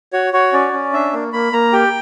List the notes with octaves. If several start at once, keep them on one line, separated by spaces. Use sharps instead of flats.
F#4 C#5
F#4 C#5
C#4 D5
C#4
D4 E5
A#3
A#3 B5
A#3 A#5
G4 G5